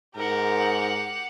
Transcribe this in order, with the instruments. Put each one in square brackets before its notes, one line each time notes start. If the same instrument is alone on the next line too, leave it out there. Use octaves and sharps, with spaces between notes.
[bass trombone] G#2 [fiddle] G4 F#5 [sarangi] A#4